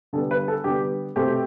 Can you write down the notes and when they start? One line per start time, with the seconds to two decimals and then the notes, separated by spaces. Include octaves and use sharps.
0.13 D3 G3 B3 A4
0.31 B4
0.48 A4
0.64 D3 G3 B3 G4
1.16 B2 A3 C4 G4